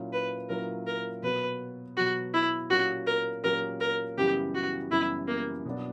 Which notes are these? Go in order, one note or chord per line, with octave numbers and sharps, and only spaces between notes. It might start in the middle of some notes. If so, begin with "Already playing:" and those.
Already playing: A#2 F#3 C#4 E4
B4
A#2 F#3 C#4 E4 A#4
A#4
B2 F#3 B3 B4
B2 F#3 B3 F#4
E4
A#2 F#3 C#4 F#4 G4
A#4
A#2 F#3 C#4 G4 A#4
A#4
F#2 C#3 E3 G3 B3 G4
F#4
F#2 C#3 E3 G3 B3 E4
A#3
B2 F#3 B3 D4